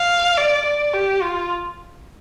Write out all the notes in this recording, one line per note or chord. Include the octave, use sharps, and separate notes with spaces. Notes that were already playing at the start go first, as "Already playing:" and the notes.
Already playing: F5
D5
D5
G4
F4